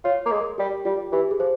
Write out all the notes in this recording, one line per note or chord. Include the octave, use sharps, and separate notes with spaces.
F4 C#5
A#3
G#3
A#4
G3 G4
G3 F4
E3 G4
G#4
F3 C5